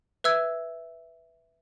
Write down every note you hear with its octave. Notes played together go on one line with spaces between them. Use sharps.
B4 E5 E6 G#6